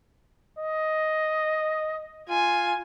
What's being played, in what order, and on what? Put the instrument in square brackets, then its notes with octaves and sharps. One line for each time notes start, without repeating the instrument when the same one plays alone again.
[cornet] D#5
[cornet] F4 [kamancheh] G#5